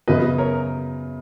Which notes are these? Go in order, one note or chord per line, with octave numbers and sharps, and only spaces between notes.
F#2 C#3 F#3 B3 B4 D#5
A#4 C#5